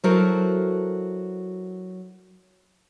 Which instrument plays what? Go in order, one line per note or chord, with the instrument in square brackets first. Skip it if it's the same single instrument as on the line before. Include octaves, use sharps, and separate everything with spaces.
[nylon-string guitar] F#3 E4 F#4 A4 A#4 C5